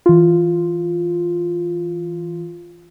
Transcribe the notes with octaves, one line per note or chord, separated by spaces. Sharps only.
E3 F4